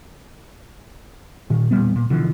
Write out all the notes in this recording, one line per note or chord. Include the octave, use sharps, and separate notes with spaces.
A#2 D#3
E1 A#2 G3 B3
A#2
B2 D3 E3 F3